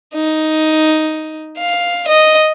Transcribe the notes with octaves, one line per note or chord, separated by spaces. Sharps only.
D#4
F5
D#5